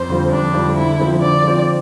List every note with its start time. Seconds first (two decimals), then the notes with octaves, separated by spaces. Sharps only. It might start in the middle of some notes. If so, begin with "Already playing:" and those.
Already playing: F2 C5
0.09 D3 G3 C4 F4
0.31 F2 D4
0.54 D3 G3 C4 F4
0.76 D3 E4
0.99 F3 C4
1.22 D3 D5
1.44 F3 C4